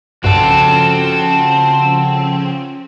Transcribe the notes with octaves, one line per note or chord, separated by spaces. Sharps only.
B1 G2 C#3 F3 C4 C#4 F#4 A4